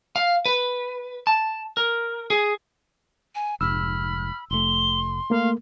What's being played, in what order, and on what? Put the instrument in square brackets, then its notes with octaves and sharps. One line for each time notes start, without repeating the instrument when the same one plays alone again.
[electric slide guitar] F5
B4
A5
A#4
G#4
[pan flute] G#5
[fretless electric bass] F1 G#2 [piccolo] B5 [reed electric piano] E6 [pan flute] F6
[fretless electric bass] F1 A3 [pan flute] C6 [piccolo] G7
[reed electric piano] A3 A#3 [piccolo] F5